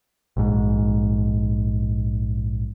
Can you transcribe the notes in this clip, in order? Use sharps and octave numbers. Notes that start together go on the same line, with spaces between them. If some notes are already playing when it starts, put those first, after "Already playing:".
A#1 G#2